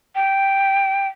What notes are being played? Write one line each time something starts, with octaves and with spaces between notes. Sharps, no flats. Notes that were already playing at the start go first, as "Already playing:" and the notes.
G5